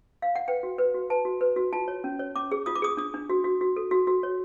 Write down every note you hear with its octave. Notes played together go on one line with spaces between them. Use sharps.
F5
F#5
B4 G5
F#4
B4
F#4
B4 A5
F#4
B4
F#4
F4 A5
C#5
C#4
C#5
C#4 D6
G#4
F4 D#6
D6
G#4 D#6
D4 D#6
D4
F#4
F#4
F#4
A4
F#4
F#4
C#5